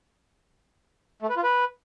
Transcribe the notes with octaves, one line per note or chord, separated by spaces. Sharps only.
A3
B4
F4
B4